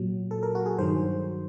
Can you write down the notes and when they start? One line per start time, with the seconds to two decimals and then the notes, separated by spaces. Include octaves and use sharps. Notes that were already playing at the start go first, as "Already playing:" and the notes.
Already playing: A#2 F#3
0.31 A4
0.43 A#4
0.55 F#4
0.66 G#4
0.78 G2 D#3 F#3 C5